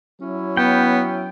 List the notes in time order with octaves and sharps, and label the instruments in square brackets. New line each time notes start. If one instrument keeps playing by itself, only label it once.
[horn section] F#3 C#4 E4
[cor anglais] B3 [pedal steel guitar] G5